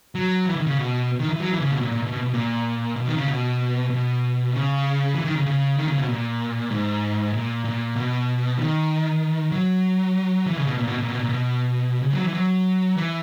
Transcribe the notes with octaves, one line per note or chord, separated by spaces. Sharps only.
F#3
E3
D#3
C#3
B2
D#3
E3
F#3
E3
C#3
B2
A#2
A#2
B2
B2
B2
A#2
B2
D#3
C#3
B2
B2
C#3
E3
D#3
C#3
C#3
D#3
C#3
B2
A#2
G#2
A#2
A#2
B2
D#3
F#3
E3
C#3
B2
A#2
B2
A#2
B2
A#2
B2
C#3
F#3
E3
F#3
E3